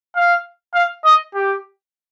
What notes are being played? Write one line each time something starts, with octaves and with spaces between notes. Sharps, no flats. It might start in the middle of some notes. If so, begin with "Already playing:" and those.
F5
F5
D#5
G4